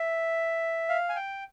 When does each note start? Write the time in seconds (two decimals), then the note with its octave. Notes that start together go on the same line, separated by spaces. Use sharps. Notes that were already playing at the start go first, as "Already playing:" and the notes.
Already playing: E5
0.89 F5
1.09 G#5
1.16 G5